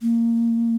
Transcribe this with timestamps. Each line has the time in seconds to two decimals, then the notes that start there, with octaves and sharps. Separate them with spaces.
0.02 A#3